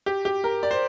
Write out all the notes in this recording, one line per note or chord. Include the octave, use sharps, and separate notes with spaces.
G4
G4
A#4
D5
C5